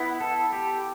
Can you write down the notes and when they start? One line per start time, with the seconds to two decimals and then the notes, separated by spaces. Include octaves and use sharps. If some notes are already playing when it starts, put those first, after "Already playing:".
Already playing: B3 E4
0.21 A4
0.53 G4